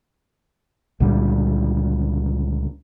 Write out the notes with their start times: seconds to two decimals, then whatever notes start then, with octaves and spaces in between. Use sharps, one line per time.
1.00 C#2 A#2 D3 G3